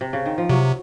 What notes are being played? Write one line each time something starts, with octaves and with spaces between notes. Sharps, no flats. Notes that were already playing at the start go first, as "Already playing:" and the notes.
C3
C#3
D#3
F3
C3 F#3